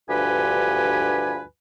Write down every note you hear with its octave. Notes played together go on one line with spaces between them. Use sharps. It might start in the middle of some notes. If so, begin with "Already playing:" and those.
D2 G2 F3 G4 B4 G#5